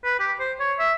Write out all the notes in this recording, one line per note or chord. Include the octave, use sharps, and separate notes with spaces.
B4
G4
C5
C#5
E5